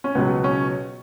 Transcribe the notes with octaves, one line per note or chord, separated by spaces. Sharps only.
C#4
C#2 B2 F#3 B3
C#4